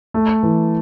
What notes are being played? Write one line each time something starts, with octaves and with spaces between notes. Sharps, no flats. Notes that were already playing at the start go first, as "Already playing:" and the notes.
A3
E3